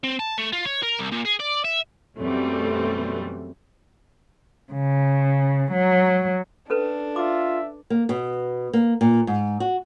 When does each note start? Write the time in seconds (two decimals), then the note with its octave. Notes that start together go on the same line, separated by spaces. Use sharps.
0.04 C4
0.19 A5
0.38 A3
0.53 F4
0.65 C#5
0.82 A#4
0.99 C2
1.11 A#2
1.25 G#4
1.40 D5
1.65 E5
2.18 F#2 B2 E3 G3 A3 C4
4.72 C#3
5.69 F#3
6.70 C#4 D4 A4 B4
7.16 F4 E5 D6
7.90 A#3
8.09 B2
8.73 A#3
9.01 A#2
9.27 G#2
9.60 F#4